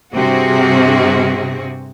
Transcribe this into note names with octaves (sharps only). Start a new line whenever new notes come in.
G2 C3 C4 F#4 G#4